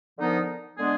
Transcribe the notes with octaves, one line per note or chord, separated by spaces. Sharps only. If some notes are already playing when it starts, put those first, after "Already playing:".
D3 F3 B3 D#4 A#4
D3 G#3 B3 D4 G#4